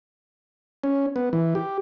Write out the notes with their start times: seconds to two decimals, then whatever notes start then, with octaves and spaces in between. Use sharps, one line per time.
0.84 C#4
1.16 B3
1.33 E3
1.55 G4